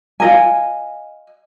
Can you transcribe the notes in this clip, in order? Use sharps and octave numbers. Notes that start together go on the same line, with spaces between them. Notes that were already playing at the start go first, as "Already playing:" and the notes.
F4 D#5 G#5